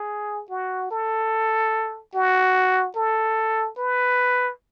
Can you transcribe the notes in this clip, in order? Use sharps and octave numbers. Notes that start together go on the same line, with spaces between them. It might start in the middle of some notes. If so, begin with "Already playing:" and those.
Already playing: G#4
F#4
A4
F#4
A4
B4